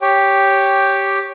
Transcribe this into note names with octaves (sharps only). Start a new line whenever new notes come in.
G4 C#5 G5